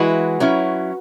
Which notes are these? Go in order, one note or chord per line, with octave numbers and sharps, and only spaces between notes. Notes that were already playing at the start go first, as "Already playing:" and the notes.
Already playing: E3 G#3 E4 F#4 B4
F#3 C#4 E4